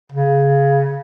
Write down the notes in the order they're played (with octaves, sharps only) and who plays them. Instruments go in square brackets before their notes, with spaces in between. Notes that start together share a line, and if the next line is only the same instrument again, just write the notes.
[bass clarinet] C#3